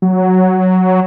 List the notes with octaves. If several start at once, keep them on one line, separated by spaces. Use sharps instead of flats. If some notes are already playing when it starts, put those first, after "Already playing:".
F#3